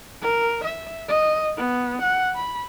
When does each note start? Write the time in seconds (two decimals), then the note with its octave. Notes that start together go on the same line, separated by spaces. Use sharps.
0.22 A#4
0.64 E5
1.09 D#5
1.57 B3
2.02 F#5
2.35 B5